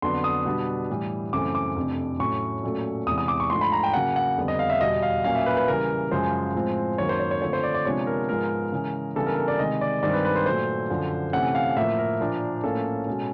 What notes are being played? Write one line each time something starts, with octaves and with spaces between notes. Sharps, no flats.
F2 D3 F#3 B3 D4 C6
D#6
B2 G3 B3 D4
A2 E3 G3
F#2 C#3 E3 A3 C4 D6
D6
F2 C3 E3 A3 D4
A2 F#3 A3 C#4 C#6
A#2 F#3 A3 C#4
E2 C3 E3 G#3 D#6
D#6
D6
C#6
G#2 F3 A3 D4 C6
B5
A#5
G5
C#3 F#3 A#3 F#5
F#5
F2 D3 G3 B3
D#5
F5
E5
E2 B2 G3 D#5
F5
A#2 F#3 A#3 C#4 F5
E5
B4
B4
C#3 E3 G3 A#4
F#2 C#3 F3 G#3 C5
A2 F3 G#3 C4
F#2 D#3 F#3 A#3 C#5
C5
C#5
C#5
D3 F3 A3 C4 C#5
C5
D5
D5
C3 F3 G#3 B3 D4 C#5
A#4
G#2 F3 G#3 B3 A#4
C#3 E3 G#3 C#4
C#3 E3 G3 B3 D4 A4
A#4
A#4
D5
C3 D#3 G#3 D#5
D5
G2 D#3 G#3 C4 D5
B4
B4
C5
A#2 F#3 A3 C5
F#2 D3 F3
C3 E3 A3 C#4 F#5
F5
A2 F3 A#3 E5
A#4
A#2 F3 A#3 D4
A2 F3 A#3 C#4 A4
B2 G#3 C#4